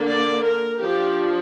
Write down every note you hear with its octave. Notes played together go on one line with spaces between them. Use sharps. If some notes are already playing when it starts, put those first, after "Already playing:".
Already playing: D3 A#3 D4
D5
A#4
F3 D4 G4